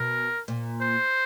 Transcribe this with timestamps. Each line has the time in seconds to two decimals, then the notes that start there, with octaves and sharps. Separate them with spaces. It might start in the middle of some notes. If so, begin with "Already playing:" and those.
Already playing: B2 A#4
0.48 A#2
0.81 C5